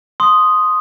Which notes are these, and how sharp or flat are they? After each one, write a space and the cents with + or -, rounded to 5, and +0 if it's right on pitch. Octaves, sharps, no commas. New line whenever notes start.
C6 +0 D#6 +0